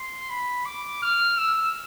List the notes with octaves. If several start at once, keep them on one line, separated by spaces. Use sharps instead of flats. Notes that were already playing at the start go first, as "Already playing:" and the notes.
Already playing: C6
B5
D6
F6
E6